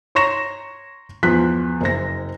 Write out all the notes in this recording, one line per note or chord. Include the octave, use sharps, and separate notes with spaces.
C#5 A#5 C6 C#6 A#6 E7
E2 F3 F4 F#6 B6
F#1 C5 A#6